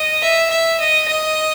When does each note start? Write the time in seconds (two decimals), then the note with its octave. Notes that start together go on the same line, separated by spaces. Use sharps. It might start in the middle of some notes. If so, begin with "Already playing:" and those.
Already playing: D#5
0.22 E5
0.50 E5
0.80 D#5
1.08 D#5